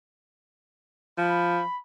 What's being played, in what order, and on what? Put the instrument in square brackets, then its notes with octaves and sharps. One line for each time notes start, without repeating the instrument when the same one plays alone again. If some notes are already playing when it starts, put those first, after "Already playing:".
[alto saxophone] F3 [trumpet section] B5